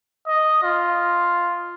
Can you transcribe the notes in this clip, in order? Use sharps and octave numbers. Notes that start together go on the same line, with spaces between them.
D#5
F4